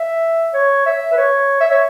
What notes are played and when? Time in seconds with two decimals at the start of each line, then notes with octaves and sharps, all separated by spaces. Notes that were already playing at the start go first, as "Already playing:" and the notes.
Already playing: E5
0.54 C#5
0.86 E5
1.12 B4
1.17 C#5
1.61 E5
1.71 C#5